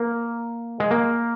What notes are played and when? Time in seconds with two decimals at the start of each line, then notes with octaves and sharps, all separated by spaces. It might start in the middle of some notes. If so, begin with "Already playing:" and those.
Already playing: A#3
0.80 G#3
0.91 A#3